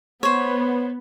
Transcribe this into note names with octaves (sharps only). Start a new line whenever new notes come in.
B3 C5 C#5